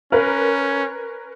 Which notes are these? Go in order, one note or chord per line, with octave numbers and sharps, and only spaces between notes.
C#4 A#4 B4